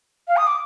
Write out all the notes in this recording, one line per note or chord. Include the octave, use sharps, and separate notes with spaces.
F5
D#6
D6